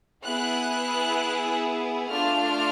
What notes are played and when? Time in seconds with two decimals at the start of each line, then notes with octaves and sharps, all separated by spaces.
0.23 B3 E4 G#4 F#6
2.09 A3 D4 F4 F6